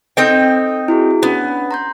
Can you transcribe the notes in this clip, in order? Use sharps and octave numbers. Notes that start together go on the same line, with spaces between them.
C4 D#4 A4 G5
E4 F#4 G#4
B3 C#4 D4
A#5 C6 G6